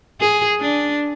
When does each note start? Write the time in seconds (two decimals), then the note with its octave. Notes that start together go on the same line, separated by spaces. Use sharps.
0.20 G#4
0.60 D4